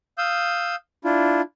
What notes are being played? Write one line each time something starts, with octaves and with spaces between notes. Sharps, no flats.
F5 D#6 E6 G6
D4 E4 F4